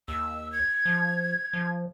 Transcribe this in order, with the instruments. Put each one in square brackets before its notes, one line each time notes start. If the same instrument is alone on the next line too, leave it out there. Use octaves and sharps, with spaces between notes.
[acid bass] D#2 [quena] E6
[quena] G#6
[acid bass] F3
F3